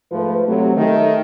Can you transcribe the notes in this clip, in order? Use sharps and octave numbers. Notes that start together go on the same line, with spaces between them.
G#2 F3 A3 B4
C3 F#3 A3
D#3 A3